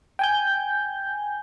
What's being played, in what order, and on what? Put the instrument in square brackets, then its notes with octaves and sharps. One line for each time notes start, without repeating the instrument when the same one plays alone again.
[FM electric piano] G5 G#5 G6